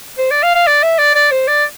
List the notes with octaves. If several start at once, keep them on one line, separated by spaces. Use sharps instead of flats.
C5
D5
F5
F5
D5
E5
D5
D5
C5
D5